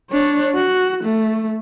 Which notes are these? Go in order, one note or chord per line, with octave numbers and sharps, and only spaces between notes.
D4 C#5
F#4
A3